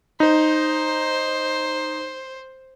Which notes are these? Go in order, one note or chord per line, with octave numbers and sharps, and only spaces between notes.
D#4 C5